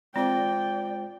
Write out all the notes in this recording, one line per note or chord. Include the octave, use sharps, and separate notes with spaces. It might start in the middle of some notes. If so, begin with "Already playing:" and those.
G#3 C4 F4 C5 D5 G5